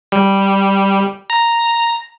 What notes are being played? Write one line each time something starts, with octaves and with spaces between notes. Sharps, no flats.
G3
A#5